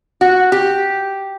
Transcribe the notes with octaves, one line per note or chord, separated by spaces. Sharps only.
F#4
G4